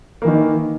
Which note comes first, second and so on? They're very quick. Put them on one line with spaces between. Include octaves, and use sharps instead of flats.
A#3 E3 D#3